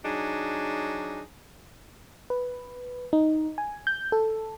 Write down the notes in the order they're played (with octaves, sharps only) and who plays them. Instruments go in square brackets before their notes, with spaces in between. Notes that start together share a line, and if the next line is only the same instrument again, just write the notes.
[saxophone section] F#3 D4 D#4 G#4
[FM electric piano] B4
D#4
G#5
G6
A4